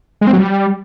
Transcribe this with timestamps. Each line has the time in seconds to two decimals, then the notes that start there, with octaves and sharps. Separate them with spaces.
0.21 G#3
0.27 C4
0.33 F#3
0.39 G3